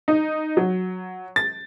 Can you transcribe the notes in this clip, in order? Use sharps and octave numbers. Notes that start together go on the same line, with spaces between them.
D#4
F#3
A6